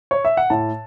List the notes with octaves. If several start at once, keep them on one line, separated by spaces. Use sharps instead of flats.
C#5
E5
F#5
A2 A5